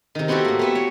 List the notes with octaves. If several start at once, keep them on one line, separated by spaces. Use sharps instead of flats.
C3 D#3
B3 C4 E4 F#4 G4 A4
A2 A#3
A3 B3 E5
C#5